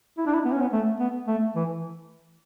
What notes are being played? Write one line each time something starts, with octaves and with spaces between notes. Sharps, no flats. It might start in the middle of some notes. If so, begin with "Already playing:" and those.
E4
D4
E4
B3
C#4
B3
A3
B3
A3
E3